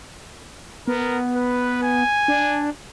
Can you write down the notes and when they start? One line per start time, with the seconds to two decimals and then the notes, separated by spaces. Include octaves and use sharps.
0.88 B3 A#4
1.36 B4
1.83 G#5
2.28 D4